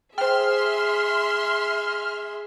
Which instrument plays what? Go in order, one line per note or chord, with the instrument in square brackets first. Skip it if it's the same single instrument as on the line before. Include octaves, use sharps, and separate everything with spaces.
[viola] G#4 [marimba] C5 G5 [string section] E5 C6 [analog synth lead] F6